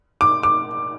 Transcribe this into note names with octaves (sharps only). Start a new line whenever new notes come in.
D6
D6